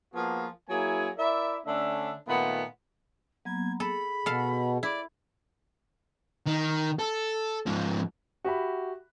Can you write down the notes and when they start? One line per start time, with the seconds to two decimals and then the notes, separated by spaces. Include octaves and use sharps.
0.14 F3 A#3 B3 F4 F#4 G#4
0.69 F#3 A#3 E4 G#4 G#5
1.18 E4 A#4 D5 E5
1.66 D3 A3 C#4 D4 E5
2.28 A#2 D#3 A3 B3
3.45 F#3 A#3 B3 G#6
3.80 G#4 A4 B5
4.26 B2 A4 F5
4.83 E4 D5
6.47 D#3
6.99 A4
7.66 G#2 F3
8.45 F#4 G4 E5 B5